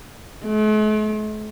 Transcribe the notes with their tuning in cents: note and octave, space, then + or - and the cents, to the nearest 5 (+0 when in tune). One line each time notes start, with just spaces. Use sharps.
A3 -45